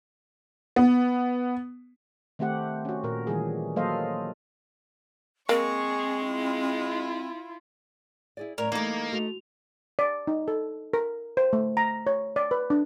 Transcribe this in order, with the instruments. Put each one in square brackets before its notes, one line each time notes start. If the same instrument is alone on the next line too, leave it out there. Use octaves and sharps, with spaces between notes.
[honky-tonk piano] B3
[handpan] D#3 A3 C4 G4 F#5
C#4 F#4
A#2 A#4
D#3 E3 G3 G#4
F#3 A#3 A4 C5 D#5 F5
[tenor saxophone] G#3 [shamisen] A#3 [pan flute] C4 [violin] G#4 C#6
[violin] E4 F4
[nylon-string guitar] E4 G#4 D5
[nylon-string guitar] F#2 A2 [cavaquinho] A#4 C#5 [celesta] D5 A#5
[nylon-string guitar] E3 G3 A3 [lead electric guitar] A#3 [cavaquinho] D#4 D6 [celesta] G#6
[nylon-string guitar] A3 [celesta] F#4 F7
[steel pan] D5
D#4
A4
A#4
C5
A3
A#5
C#5
D5
B4
D4